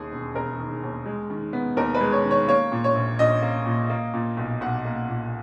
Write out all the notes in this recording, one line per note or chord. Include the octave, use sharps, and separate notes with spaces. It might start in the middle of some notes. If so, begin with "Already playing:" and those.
Already playing: D#2 D#3 G#4
E1
E1 A#4
D#3
D#2
G#3
D#3
B3
D#2 A#4
B4
G#3
C#5
D#3
C#5
A#3 C#5
A#2
C#5
A#1
A#1 D#5
A#3
A#2
A#3
A#2
B1
B1 F#5
A#3
A#2